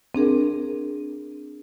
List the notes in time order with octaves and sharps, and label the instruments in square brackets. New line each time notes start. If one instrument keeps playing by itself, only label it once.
[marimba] C4 D4 G#4 A#4